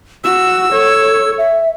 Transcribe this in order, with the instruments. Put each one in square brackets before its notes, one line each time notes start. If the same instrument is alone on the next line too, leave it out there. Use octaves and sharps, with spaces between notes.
[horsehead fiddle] F#4 [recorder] E6
[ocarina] A4 [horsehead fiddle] C#5
[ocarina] E5